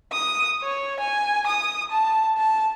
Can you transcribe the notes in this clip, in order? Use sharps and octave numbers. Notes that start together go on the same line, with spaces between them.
D#6
C#5
G#5
D#6
A5
A5